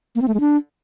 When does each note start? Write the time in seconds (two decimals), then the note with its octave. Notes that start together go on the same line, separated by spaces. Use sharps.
0.16 A#3
0.22 C4
0.28 A3
0.34 G#3
0.40 D4